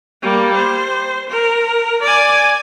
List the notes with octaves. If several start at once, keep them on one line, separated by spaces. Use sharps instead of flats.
G3 A#3
C5
A#4
D5 G#5